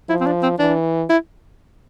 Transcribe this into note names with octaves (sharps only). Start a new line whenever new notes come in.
F3 E4
C4
D4
C4
E3 D4
E4